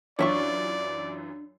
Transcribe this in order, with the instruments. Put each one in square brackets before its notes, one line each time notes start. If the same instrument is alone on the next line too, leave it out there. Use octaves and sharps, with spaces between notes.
[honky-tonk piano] F#2 E3 F4 [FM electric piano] D4 [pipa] C#5 E5 C#6 [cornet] D5